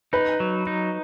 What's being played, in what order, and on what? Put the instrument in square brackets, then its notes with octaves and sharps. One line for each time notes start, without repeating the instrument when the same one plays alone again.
[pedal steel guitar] D#4 [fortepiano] B4
[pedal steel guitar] F#3
D#4